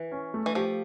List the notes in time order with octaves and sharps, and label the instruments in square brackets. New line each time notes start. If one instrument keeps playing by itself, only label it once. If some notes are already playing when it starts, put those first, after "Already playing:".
Already playing: [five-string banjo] E3
[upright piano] C#4
A3
[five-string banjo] E3
[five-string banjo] F3 [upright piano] G4